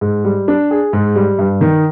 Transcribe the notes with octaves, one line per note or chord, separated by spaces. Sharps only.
G#2
G3
D4
G#4
G#2
G3
G2
D#3